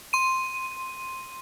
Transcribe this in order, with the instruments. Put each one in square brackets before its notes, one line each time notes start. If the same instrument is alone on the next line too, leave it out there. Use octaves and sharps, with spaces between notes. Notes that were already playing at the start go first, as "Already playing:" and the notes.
[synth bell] C6 D#7